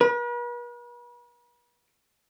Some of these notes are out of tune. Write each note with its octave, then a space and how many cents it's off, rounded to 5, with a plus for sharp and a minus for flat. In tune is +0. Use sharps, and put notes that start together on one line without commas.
B4 -45